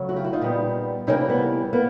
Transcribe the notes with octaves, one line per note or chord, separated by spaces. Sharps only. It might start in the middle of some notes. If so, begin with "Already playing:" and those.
Already playing: C#3 F#3 A3
E4 F#4
F4 G4
E4 F#4
D#4 F4
A#2 G3 B3
C3 E3 G3 A#3 C#4 D#4
B3
A#3 B3